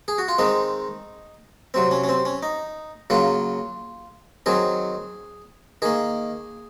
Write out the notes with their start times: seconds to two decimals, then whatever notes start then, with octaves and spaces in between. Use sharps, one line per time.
0.08 G#4
0.18 F#4
0.28 F4
0.38 D#3 G#3 C4 D#4
1.74 C3 F#3 C4
1.91 C#4
2.04 C#4
2.09 C4
2.25 C#4
2.43 D#4
3.10 C#3 F#3 A#3 F4
4.46 D#3 F#3 C4 G#4
5.82 D#3 A#3 G#4